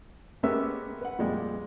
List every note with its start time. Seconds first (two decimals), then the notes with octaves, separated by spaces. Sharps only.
0.43 G#3 A#3 B3 C#4 G4 E5
1.01 B4 F#5
1.19 F2 A#2 G3 G#3